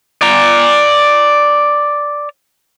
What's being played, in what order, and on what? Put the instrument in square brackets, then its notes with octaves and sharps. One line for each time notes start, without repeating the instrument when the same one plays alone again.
[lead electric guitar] D5 A#5